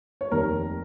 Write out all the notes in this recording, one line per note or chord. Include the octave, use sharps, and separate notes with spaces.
C#5
F1 D#2 D#3 A#4